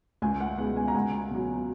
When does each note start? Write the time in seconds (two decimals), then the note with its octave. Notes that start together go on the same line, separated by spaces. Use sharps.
0.22 C#2 G#5
0.40 F#5
0.58 B2 G#3 B3 F#5
0.76 G#5
0.88 A#5
0.95 C#2 G#5
1.31 B2 F#3